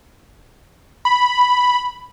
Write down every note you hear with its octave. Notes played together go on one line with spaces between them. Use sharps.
B5